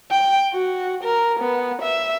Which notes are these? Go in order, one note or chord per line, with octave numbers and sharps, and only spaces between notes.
G5
F#4
A#4
B3
E5